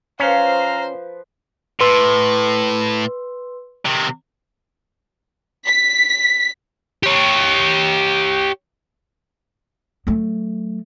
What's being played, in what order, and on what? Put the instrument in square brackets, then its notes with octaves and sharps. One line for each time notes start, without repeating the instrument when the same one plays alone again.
[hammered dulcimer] F3 B4 [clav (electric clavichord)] C#4 [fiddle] C5 [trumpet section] F5 A#5
[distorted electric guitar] A2 [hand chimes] B4 C6 E6
[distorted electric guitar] C3 D#3
[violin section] B6
[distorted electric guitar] G4 C#5
[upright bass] F#3 A3